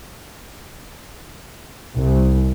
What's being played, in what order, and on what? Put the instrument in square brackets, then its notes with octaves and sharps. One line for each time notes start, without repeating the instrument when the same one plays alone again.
[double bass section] C2